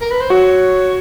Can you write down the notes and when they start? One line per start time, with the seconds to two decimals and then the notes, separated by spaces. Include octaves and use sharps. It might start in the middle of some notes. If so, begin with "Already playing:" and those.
0.01 A#4
0.11 B4
0.21 C5
0.30 F#4 C#5